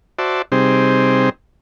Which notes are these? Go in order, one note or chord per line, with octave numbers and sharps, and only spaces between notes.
F#4 C5 D5 E5 A5
C3 G3 C4 D#4 G#4 C5